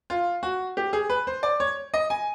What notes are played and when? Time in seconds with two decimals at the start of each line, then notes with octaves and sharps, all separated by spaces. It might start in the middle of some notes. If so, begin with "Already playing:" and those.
0.10 F4
0.43 F#4
0.77 G4
0.93 G#4
1.10 B4
1.27 C5
1.43 D5
1.60 C#5
1.94 D#5
2.10 G#5